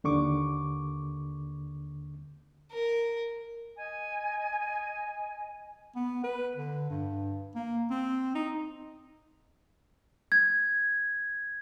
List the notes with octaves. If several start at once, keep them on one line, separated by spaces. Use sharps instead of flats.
D#2 D3 C#6 D6
A#4
D#5 G#5
B3
B4
D3
G2
A#3
C4
D#4
G#6